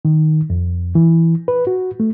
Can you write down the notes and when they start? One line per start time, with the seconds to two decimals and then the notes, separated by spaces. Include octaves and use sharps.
0.05 D#3
0.50 F2
0.95 E3
1.48 B4
1.67 F#4
2.00 A3